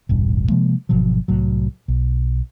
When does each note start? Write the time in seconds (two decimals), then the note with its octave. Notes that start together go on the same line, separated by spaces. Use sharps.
0.09 E1 A1 G2
0.49 C3 F3 G#3 A#3
0.89 G#1 B2 F3 F#3
1.28 C2 A2 F#3
1.88 B1